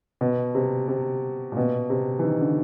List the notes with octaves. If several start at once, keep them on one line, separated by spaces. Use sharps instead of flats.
B2
C3
C3
A#2
B2
C3
E3
D#3
D3